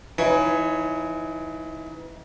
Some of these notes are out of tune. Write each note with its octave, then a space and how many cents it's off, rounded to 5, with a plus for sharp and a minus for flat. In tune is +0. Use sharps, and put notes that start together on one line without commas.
E3 +20 D#4 +35 C#5 +0